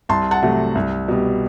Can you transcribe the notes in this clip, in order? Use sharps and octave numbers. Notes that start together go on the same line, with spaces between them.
C2 A5 C6
F#5 A5
C3 F#3 A3
C2
B2 G3